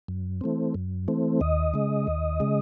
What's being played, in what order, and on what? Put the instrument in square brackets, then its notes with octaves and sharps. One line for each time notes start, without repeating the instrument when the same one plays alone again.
[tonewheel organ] F#2
E3 A3 C4
F#2
E3 A3 C4
D#2 D#5
C#3 G#3
D#2
C#3 G#3